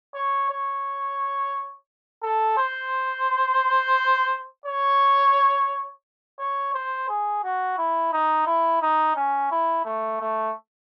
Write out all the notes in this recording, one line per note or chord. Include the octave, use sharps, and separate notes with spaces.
C#5
C#5
A4
C5
C#5
C#5
C5
G#4
F#4
E4
D#4
E4
D#4
C#4
E4
A3
A3